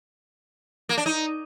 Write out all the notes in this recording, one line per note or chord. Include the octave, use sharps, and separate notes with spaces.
A#3
D4
D#4